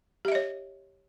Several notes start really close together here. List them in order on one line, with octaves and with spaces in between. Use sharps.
G4 E5 D#5 C#5